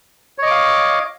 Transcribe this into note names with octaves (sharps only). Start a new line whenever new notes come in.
C#5 D#5 F5 D6